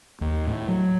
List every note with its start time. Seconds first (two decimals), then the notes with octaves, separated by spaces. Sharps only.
0.21 D#2
0.47 A2
0.68 F#3